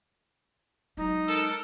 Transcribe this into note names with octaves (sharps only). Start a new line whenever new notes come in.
F#3 G#3 D#4
A4 A#4 E6